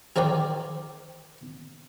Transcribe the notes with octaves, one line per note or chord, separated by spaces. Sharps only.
G#4 A#4 C5 D5 G5